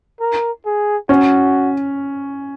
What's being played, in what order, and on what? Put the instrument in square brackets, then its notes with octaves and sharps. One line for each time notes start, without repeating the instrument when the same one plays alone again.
[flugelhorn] A#4
G#4
[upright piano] C#4 [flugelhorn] F#4